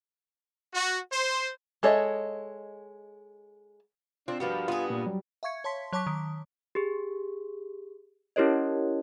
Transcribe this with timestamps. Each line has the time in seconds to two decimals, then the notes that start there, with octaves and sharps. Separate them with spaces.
0.74 F#4
1.12 C5
1.83 G#3 A4 C#5 D#5 E5
4.28 C4 D4 F4
4.40 G2 F3 A#3 B3 F#4
4.68 B3 F4 G#4 F5
4.90 A#2 A#3 F4
5.06 F#3 G3
5.43 E5 F5 C#6 G#6 C#7
5.64 C#5 A5 C6 B6
5.93 F#3 C#5 A5 C#6 D6 B6
6.07 D#3
6.75 G4 G#4
8.36 C#4 E4 G4 A#4 C#5 D#5